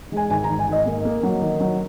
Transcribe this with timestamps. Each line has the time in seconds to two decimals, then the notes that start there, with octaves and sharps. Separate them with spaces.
0.12 G#3 G#5
0.30 G#1 G#5
0.44 A#5
0.49 G#1
0.59 G#5
0.68 G#1 D#5
0.86 A#3
1.05 A#3
1.23 F#3
1.41 D#3
1.60 F#3